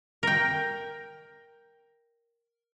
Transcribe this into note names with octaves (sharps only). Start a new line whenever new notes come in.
A#4 G5